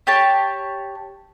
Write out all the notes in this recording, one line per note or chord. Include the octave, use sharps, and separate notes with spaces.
G4 C#5 A5